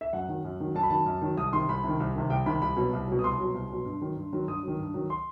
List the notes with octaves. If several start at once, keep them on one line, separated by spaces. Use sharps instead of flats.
E5
F#2 F#5
D#3 F#3
F#2
D#3 F#3
F#2 A5
B5
D#3 F#3 A5
F#2
D#3 F#3
C2 D#6
C3 D#3 C6
C2 B5
C3 D#3
C2
C3 D#3
C2 G5
C3 D#3 B5
C2 B5
B2 F#3
C2
B2 F#3
D#6
C2 C6
B2 F#3
C2
B2 F#3
G2
D#3 F#3
G2
D#3 F#3
G2 D#6
D#3 F#3
G2
D#3 F#3
C6